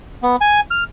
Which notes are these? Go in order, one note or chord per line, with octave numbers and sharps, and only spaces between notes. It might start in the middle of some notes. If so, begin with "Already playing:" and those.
B3
G#5
F6